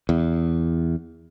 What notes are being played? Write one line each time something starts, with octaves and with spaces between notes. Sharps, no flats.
E2